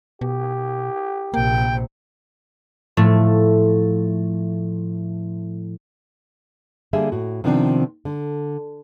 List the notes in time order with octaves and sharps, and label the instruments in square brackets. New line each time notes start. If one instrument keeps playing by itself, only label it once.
[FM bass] B2 [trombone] G4
[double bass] A#1 C3 [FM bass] A#3 [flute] G5
[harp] A2 F3 A3
[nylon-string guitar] D3 G3 A#3 G#4 E5
A2 F#4
C3 D#3 F3 B3 C4 D4
D3